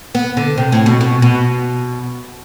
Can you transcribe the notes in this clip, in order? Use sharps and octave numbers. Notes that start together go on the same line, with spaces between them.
B3
D3
C3
A2
B2
B2
B2